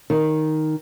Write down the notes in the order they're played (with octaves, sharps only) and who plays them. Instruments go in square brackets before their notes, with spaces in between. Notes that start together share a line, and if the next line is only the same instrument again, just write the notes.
[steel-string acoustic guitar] D#3